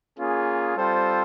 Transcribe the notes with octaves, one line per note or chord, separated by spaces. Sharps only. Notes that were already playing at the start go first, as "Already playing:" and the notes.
A#3 C#4 F4 G#4
G3 C4 F4 A4 C5